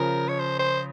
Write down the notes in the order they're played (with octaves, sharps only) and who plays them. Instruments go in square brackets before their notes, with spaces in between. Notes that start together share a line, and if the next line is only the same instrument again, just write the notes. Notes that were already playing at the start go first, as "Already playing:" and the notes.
Already playing: [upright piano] C#3 F3 [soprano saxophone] A#4
[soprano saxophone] C#5
C5
C5